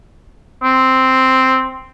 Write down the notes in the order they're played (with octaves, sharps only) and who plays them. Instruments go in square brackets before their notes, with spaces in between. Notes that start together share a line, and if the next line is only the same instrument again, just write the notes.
[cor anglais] C4